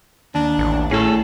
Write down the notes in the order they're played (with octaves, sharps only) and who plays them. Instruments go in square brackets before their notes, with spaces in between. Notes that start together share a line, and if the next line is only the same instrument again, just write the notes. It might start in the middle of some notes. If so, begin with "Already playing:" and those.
[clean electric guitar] D#2 [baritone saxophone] D4
[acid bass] A1
[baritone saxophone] A2 [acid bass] C#4 [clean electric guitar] G#4 A4